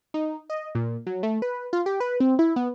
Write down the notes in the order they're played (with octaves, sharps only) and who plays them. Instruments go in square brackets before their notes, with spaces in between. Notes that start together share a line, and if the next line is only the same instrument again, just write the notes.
[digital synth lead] D#4
D#5
A#2
F#3
A3
B4
F4
G4
B4
C4
E4
B3